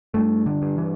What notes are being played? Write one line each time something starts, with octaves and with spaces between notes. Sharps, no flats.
G2 A3
D3
G2
E3